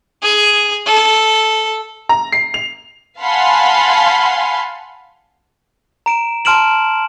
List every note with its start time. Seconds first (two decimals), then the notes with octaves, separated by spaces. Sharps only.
0.23 G#4
0.86 A4
2.09 A#5
2.32 C7
2.54 F7
3.21 F5 F#5 G#5 A5 B5 C6
6.06 A#5 D7 E7
6.45 A5 C6 F6 D7 E7 F#7